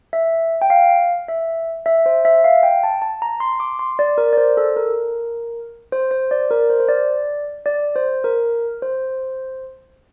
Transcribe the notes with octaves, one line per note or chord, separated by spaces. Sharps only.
E5
G5
F5
E5
E5
C5
E5
F5
G5
A5
A5
A#5
C6
D6
C6
D5
A#4
D5
C5
A4
A#4
C5
C5
D5
A#4
C5
C5
D5
D5
C5
A#4
C5